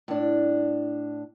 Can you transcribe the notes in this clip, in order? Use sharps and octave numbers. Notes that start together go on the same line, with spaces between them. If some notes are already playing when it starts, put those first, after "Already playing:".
A2 D4